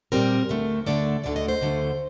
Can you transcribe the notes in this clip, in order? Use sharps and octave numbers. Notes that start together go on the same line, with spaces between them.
A#2 G3 C4 A#4
D2 D3 A3
D2 D3 A3 D5
D2 D3 A3 D5
D#5
C5
D2 D3 A3